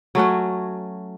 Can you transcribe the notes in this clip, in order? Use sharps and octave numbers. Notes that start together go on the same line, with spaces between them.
F#3 A3 C#4 F#4